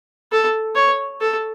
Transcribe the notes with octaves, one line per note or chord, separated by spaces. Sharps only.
A4
C#5
A4